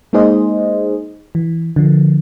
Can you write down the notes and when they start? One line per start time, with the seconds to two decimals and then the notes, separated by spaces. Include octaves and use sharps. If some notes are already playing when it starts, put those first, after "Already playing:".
0.13 G#3 A#3 D#4 G#4 C5 D#5
1.35 E3
1.76 D3 F3